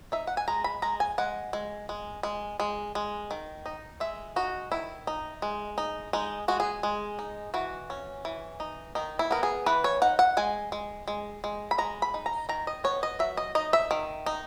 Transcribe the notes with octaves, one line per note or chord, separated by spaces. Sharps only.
D#4 E5
F#5
G#5
G#3 A#5
B5
G#3 A#5
G#5
G#3 F#5
G#3
G#3
G#3
G#3
G#3
D#3
D#4
G#3 E5
D#4 F#4
D#3 E4
D#4
G#3
D#4
G#3 D#4
G#3 F#4
G#4
G#3
D#4
E3 F#4
C#4
E3
D#4
D#3 D#4
E4
B3 A#4
G#4
E3 B4
C#5
D#4 F#5
F#5
G#3 G#5
G#3
G#3
G#3
B5
G#3 A#5
B5
D#4
A#5
D#3 A#5
D#5
B3 C#5
D#5
F#3 E5
D#5
D#4 D#5
E5
D#3
D#4